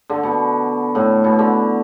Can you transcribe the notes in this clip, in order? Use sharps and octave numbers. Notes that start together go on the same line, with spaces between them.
D3
B2
A2
B2
D3